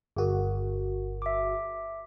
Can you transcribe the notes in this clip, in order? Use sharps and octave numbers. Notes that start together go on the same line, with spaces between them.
G1 F#4 G#4 A#4
E5 D6